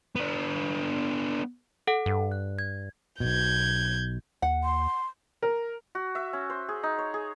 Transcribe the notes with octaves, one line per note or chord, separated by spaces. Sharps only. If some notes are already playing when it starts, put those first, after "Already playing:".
B3 D4
A4 F#5
G2
F#6
G#6
B1 B2 G6 G#6
D#2 F#5
C6
A#4
F#4
E5
C#4
C5
G#4
D#4
C#5
G#4